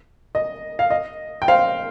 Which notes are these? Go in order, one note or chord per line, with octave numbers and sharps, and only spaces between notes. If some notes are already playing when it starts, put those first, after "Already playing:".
D#5
F5
D#5
G5
C5 F5